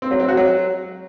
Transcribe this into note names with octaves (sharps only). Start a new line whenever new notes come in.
C4
F#3
C4
F#4
F#3